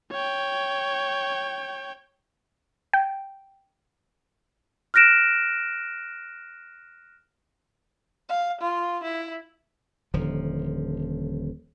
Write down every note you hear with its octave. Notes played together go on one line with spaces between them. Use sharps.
C#5 G5
G5
F6 F#6 A#6 D7 E7
F5
F4
E4
D#1 D3 F3